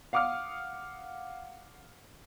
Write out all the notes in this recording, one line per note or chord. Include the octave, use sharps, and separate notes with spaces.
F5 F#5 D6 D#6 F6